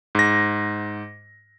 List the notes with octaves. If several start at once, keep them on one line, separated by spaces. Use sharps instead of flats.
G#2 A#6